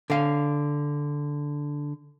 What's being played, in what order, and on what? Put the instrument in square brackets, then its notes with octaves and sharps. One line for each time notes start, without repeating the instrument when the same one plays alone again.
[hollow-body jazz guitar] D3 F5